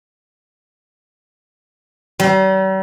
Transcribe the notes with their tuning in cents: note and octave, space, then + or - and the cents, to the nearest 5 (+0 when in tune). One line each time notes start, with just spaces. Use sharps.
G3 -45